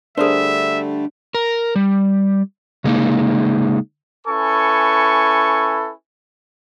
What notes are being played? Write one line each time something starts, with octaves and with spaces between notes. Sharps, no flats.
D3 G3 A3 D4 G#4 A#4 C5 E5
A#4
G3
C#3 G#3 A#3 D#4
C#4 E4 A4 B4 G#5 C#6